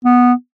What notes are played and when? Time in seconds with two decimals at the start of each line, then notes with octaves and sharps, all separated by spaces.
0.05 B3